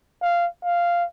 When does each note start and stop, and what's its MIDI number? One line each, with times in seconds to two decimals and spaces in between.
0.22 0.47 77
0.64 1.05 77